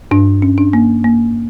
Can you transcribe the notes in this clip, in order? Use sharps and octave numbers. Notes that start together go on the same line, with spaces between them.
G2 D4
C#4
D4
A#3
A#3